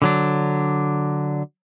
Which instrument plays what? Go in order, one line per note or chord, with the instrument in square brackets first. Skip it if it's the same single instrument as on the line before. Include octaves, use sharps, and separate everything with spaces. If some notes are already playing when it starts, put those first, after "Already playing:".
[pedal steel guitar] D3 F#3 D4